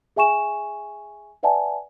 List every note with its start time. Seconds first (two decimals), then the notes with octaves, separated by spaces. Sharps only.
0.16 G#4 E5 G#5 C#6 E7
1.43 B4 D5 E5 F#5 G#5 A5